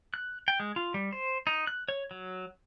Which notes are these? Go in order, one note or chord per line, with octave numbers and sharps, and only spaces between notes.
F#6
G5
G#3
F4
G3
C5
D#4
F#6
C#5
F#3